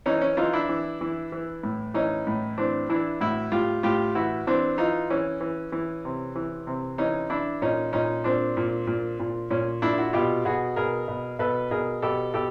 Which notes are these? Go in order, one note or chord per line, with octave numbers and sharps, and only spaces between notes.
E3 C#4 D#4
C#4
E3 D#4 F4
D4 E4
E3
E3
E3
A2
E3 C#4 D#4
A2
E3 C4 D4
E3 D4 E4
A2 E4 F#4
A2 F4 G4
A2 F4 G4
E3 E4 F#4
E3 C4 D4
E3 D#4 F4
E3 C#4
E3
E3
C3
E3
C3
E3 C#4 D#4
E3 D4 E4
A#2 C#4 D#4
A#2 C#4 D#4
A#2 C4 D4
A#2
A#2
A#2
A#2 C#4
A#2 D4 E4
E4 F#4
B2 F4 G4
B2 F#4 G#4
B2 G#4 A#4
B2
B2 A4 B4
B2 G#4 A#4
B2 G4 A4
B2 G4 A4